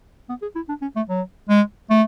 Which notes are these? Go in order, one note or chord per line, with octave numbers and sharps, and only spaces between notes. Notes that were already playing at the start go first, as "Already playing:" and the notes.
B3
G#4
E4
D4
C#4
A3
F#3
G#3
A3